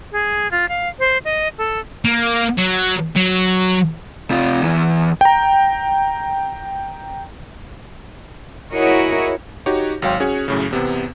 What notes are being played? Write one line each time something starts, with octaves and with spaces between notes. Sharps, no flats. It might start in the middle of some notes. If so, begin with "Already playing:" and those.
G#4
F4
F5
C5
D#5
A4
A#3
F#3
F#3
C3 F4
E2 E3
G5 A#5
E4 F#4 G#4 A#4 C#5 D#5
D#4 F#4 G4 C#5
G#1 F#3 C#5 F5 G5 C6
C#4 F#4 G#4 C#5
F#2 A2 C#3
E2 C3 B3